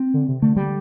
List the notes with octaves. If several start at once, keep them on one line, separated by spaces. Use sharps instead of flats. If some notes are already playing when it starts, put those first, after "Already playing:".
Already playing: C4
D3
C3
D3 A3
G3